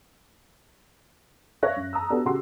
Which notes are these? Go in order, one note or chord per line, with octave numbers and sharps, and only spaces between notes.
C#5 D5 E5 F5 F#6 A#6
F#2
A5 A#5 D#6 E6
B3 D4 F#4 G4 A4
C#3 F#4 G4 C6 E6